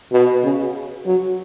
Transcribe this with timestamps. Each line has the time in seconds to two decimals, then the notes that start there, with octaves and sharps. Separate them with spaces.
0.12 B2
0.44 C#3
1.06 F#3